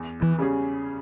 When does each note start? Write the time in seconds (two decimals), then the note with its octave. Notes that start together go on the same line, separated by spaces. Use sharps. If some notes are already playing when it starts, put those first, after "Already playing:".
Already playing: E2
0.22 E3
0.38 C#3 G3 C#4 G#4